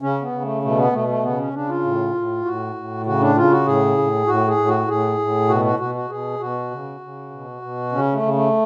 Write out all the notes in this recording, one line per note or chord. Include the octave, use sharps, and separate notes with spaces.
C#3 C#4
B3
C#3
A3
B2 A3
B3
B2 A3
A3
C#3 B3
C#4
C#3 D4
F4
A2
A2
A2 F#4
A2
C#3 F#4
D4
C#3 F4
F#4
A2 G#4
A2
A2 F#4
G#4
A2
F#4
A2 G#4
A2
B2 F#4
F#4
B2 F#4
F#4
B2 G#4
B2 F#4
C#3
C#3
B2
B2
C#3 C#4
A3
C#3
A3